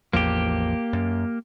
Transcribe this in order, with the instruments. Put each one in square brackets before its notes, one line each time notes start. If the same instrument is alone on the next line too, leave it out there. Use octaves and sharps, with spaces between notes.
[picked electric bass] A1 E2 F3 [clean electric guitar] A#3 G4
[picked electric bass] F#2